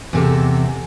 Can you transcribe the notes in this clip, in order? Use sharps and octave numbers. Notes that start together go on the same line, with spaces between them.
E2 C3 A4